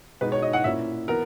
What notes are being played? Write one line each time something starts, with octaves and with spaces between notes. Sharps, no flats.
B2 G#3 B3 D#4 B4
C#5
D#5
F#5
A#2 A#3 C#4 E4 E5
E3 B3 A#4